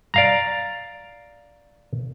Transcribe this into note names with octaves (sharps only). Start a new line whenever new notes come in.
D5 F5 A#5